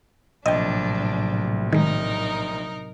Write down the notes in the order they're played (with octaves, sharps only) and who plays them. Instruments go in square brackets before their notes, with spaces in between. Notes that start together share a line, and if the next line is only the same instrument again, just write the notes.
[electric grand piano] A#1 [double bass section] A2 C3 F#3 [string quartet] D4 [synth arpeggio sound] D#5 G5
[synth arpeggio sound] D#3 G#3 [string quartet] D#4 A#4